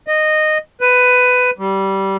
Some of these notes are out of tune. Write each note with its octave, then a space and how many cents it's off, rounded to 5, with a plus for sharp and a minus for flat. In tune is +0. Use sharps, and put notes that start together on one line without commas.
D#5 -15
B4 +15
G3 -15